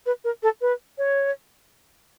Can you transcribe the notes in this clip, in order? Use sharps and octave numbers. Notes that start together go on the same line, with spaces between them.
B4
A#4
A4
B4
C#5